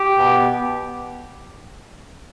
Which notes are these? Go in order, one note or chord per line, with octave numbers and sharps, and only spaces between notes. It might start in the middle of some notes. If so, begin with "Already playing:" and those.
Already playing: G4
B2 B3